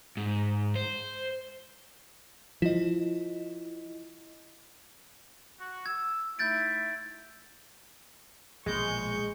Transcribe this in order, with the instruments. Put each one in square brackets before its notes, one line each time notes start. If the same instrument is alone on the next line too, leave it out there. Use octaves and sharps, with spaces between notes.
[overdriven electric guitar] G#2
C5
[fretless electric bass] F3 [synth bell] E4 D#5
[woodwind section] F#4
[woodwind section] E6 [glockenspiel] G#6
[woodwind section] A3 D#4 E4 [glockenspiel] G6 A6 D7
[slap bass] A#1 B2 [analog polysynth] G#3 [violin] C#6 G6